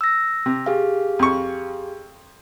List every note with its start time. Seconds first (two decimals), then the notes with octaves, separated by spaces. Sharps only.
0.01 E6 A#6
0.46 C3
0.66 G4 G#4 F5
1.19 F2 C#6